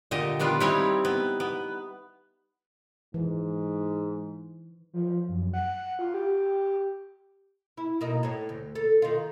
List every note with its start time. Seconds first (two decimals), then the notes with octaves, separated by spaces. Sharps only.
0.11 A#2 D3 G4 D#5
0.39 D#3 G3 B3 D4 F4
0.60 G3 C4 D#4 E4 C#5
1.05 B3
1.40 B3
3.14 G#2 E3
4.93 F3
5.29 F#2
5.54 F#5
5.99 F4
6.14 G4
7.77 E4
8.01 B2 A#3 D#4
8.23 A2 C#5
8.49 D2
8.75 A4
9.02 D#3 F4